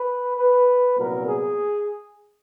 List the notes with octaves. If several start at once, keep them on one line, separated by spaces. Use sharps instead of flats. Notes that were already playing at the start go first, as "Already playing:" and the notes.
Already playing: B4
B4
C2 A#2 F#3 B3 A#4
G#4